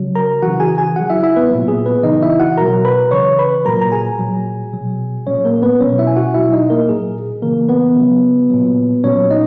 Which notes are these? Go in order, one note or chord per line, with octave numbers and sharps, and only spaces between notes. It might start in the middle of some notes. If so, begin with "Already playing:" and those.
Already playing: C#3 F#3
A#4 A#5
C#3 E3 F#4 F#5
G#4 G#5
G#4 G#5
C#3 F#3 F#4 F#5
E4 E5
E4 E5
B3 B4
A#2 F#3
G#4
B3 B4
C#3 E3 D#4 D#5
E4 E5
F#4 F#5
B2 F#3 A#4 A#5
B4 B5
C#3 E3 C#5 C#6
B4 B5
A#2 F#3 A#4 A#5
A#5
G#4 G#5
A#2 F#3
B2 F#3
A#2 F#3 C#4 C#5
A#3 A#4
B3 B4
B2 F#3 C#4 C#5
E4 E5
G#5
F#4 F#5
B2 F#3 E4 E5
D#4 D#5
A#3 A#4
A#2 F#3 G#4
C#3 E3 A#3 A#4
B3 B4
C#3 F#3
A#2 F#3
A#2 F#3 C#4 C#5
D#4 D#5